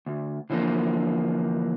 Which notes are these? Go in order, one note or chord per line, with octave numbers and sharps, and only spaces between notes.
D2
D3 E3 F3 A3 A#3